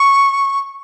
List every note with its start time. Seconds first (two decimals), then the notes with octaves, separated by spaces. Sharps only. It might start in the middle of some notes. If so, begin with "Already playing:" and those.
Already playing: C#6